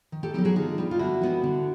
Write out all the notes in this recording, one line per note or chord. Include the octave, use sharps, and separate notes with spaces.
D#3
G4 A4
F#3 B3 D#4 G4 A4
F#4 G#4
D3 D#4 F4
G3 B3 D#4
F4
D3 E4 F#4
G3 B3 D#4
D3